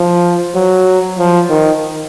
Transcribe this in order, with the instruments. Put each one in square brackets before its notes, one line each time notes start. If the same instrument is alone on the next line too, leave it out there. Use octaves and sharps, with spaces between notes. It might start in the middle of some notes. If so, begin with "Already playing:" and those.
Already playing: [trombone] F3
F#3
F3
D#3